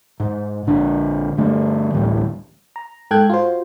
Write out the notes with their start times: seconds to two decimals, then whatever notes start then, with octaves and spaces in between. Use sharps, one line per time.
0.20 G#2
0.67 A#1 D3 D4
1.38 G2 D3 A3
1.94 A1 D2 A2 G3
2.76 A#5
3.11 G#2 A4 G5 F#6 G#6
3.30 F4 F#4 C5